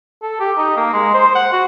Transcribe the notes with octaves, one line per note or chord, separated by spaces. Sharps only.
A4
G4
D#4
A#3
G#3
C5
F#5
F#4